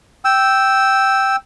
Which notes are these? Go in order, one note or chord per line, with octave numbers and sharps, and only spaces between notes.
G5 E6